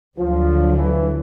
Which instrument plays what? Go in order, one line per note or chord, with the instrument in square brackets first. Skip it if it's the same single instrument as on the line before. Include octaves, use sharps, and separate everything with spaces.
[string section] D2 D3 F#3 [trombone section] F3
[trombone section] E3